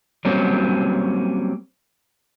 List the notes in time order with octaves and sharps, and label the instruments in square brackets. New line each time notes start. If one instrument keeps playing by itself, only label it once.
[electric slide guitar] F#3 G3 A#3 C4 C#4